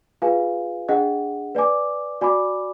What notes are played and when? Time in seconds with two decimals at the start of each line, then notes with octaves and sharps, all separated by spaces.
0.22 F4 G#4 B4 F5 G#5
0.89 D4 G#4 D#5 F#5
1.55 B4 D5 G#5 D6
2.21 F#4 D5 G#5 B5 D6